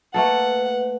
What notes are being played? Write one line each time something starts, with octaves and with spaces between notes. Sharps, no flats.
A3 A#3 A4 B4 F#5